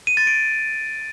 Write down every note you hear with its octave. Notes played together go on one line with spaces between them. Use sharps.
D#7
A6
D7